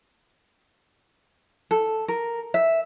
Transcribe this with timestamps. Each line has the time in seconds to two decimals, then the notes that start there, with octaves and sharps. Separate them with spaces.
1.71 A4
2.08 A#4
2.54 E5